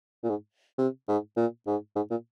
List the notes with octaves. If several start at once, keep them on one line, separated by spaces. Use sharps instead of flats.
A#2
G#2
C3
G#2
A#2
G#2
G#2
A#2